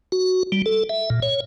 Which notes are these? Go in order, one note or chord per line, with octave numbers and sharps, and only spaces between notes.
F#4
G3
A4
E5
A#2
C#5